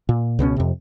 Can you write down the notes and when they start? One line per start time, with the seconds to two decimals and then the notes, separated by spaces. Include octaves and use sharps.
0.09 A#2
0.39 C#2 B2 G#3 C#4
0.57 F2 C3